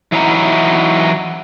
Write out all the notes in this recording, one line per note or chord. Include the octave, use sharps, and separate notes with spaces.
E3 F#3 D#4 E4 G5 A#5